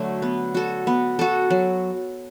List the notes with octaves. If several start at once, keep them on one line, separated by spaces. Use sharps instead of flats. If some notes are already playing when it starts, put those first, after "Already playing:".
Already playing: D3 F#3 A3
B3
F#4 A4
B3
F#4 A4
F#3